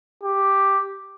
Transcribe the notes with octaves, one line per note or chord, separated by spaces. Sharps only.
G4